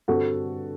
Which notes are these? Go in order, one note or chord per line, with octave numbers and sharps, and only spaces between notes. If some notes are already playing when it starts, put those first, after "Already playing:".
G2 D3 G3 C4 F#4 A4